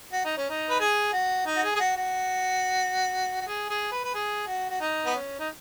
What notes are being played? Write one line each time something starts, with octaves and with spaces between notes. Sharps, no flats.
F#4
D#4
C#4
D#4
B4
G#4
F#4
D#4
F#4
G#4
G#4
F#4
F#4
F#4
G#4
G#4
B4
B4
G#4
F#4
F#4
D#4
B3
C#4
D#4